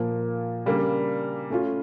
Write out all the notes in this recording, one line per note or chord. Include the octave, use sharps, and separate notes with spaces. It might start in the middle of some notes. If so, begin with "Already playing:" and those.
Already playing: A#2 F3 A#3
C#3 G3 A#3 D4
A3 C#4 F4